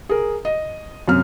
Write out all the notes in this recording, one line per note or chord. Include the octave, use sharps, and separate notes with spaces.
G#4 A#4
D#5
F#2 C3 F6